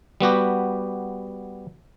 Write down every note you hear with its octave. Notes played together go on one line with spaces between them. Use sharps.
G3 B3 F#4 G4